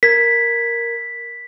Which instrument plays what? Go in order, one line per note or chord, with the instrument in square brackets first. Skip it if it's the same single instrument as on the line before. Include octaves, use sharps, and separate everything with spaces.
[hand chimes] A#4 G#6 [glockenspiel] B6